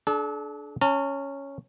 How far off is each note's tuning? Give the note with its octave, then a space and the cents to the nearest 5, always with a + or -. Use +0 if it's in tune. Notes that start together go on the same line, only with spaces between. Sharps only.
D4 +0 A4 -45
C#4 +0 A5 +45